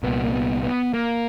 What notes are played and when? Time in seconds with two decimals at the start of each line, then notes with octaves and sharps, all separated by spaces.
0.03 C2 A#2 B3
0.24 A#3
0.33 B3
0.63 B3
0.94 A#3